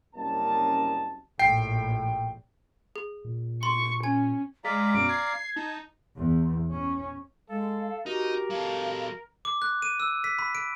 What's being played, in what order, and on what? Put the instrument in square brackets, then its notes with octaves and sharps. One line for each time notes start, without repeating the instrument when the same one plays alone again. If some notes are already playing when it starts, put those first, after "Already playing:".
[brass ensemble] C2 F#2 C#3 A#3 D#5 A5
[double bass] A#1 A2 [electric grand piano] G5 C7
[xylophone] G#4
[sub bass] A#2
[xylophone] C6 [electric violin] C#6
[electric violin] C#4 [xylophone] G#5 G#6
[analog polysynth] G#3 [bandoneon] D5 F5 A#5 [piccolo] B6
[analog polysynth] F#2 B2 [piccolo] D7
[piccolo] G#6 [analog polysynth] C7
[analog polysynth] D#4 [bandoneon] A5
[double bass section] E2
C#4
[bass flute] G#3 [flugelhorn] A4 [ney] F5
[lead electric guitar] D#4 [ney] F#4 [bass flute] G4 [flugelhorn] A#4
[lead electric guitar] F#3 A4 [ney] F5
[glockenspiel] D6
F#6
D#7
E6
B6
B5
D7